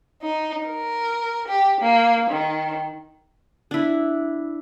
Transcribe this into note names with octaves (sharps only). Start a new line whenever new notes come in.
D#4
A#4
G4
A#3
D#3
D4 E4